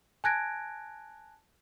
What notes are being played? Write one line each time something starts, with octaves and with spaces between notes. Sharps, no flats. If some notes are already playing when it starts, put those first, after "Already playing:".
G#5 A5 F#6 G#6 A#6 D7